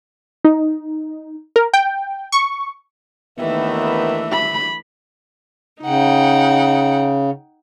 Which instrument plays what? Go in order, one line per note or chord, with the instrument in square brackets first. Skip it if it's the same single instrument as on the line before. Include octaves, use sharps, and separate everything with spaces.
[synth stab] D#4
A#4
G5
C#6
[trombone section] D#2 D#3 B3 [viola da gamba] E3 A3 D4 [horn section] E5
[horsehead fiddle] B5
[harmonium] C#3 [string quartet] D#4 F#5 G5